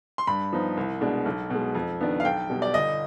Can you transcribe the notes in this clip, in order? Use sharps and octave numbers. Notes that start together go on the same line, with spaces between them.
C6
G2 B5
F3 B3 D#4
C2
B2 G#3 D4
B1
B2 G#3
F2
D#3 B3 D4
F5
B1 G5
B2 G3
D5
G1 D#5